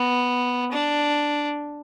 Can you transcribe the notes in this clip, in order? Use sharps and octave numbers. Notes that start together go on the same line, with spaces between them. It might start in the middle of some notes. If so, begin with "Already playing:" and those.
Already playing: B3
D4